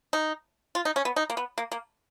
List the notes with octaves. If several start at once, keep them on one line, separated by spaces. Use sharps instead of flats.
D#4
F4
D#4
C#4
B3
D#4
A#3
B3
A#3
A#3